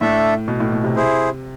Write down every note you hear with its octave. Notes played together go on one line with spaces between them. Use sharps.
A2 A3 D4 A4 E5
B2
A2
B2
C3
E4 G#4 C5